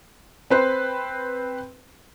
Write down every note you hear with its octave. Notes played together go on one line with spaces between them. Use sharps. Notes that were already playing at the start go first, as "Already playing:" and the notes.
C4 B4 C5